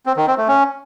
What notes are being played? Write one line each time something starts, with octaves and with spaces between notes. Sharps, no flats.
C4
D#3
C4
A3
C#4